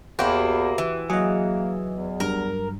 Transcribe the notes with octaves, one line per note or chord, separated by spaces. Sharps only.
E2 A#3 E4 F#4 G4 C5
E3
F#3 A#3 G#4 D#5
E2
G2 A#4